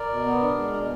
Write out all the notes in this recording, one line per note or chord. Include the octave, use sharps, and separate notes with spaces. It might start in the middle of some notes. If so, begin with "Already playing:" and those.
Already playing: A#4 D5
B2
B3
D4
G#3
B2